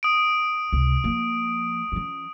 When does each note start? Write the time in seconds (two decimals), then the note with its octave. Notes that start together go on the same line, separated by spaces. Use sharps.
0.03 D#6 D7
0.72 C#2 C3
1.04 F3 A#3
1.92 F3 C#4